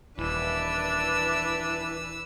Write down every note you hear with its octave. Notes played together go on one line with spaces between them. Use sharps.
D#1 E3 D4 B4 E6